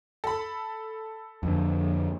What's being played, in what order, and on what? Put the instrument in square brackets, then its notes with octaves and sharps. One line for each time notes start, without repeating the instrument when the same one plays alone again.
[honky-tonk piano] A4 B5
[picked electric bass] F2 D3